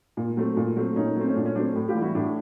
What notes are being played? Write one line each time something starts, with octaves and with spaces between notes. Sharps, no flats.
A#2
F#3 A3 C4
A#2
F#3 A3 C4
A#2 C#4 D#4
F#3 A3 C4
C#4
A#2 D4
C#4
F#3 A3 C4 D4
A2
F4 G4
E3 G3
E4 F#4
A2 D4 E4